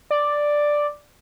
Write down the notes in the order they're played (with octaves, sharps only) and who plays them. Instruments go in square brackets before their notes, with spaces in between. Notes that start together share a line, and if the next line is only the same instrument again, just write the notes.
[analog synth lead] D5